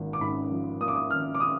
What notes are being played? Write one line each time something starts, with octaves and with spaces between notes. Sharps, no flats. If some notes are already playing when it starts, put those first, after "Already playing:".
Already playing: G#1 A#3
D6
G#2 B5
F3
A#3 D#6
D6
D#6
G#1 F6
D6
D#6